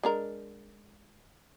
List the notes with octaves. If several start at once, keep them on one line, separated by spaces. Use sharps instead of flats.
G#3 D4 A#4